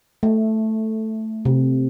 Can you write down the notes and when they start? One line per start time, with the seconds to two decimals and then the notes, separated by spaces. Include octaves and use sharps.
0.23 A3
1.45 C3